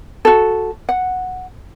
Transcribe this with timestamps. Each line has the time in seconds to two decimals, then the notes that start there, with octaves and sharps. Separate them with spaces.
0.25 F#4 A4
0.89 F#5